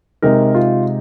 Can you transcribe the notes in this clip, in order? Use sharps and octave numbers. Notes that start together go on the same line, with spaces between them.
C3 G#3 D#4 A#4
F4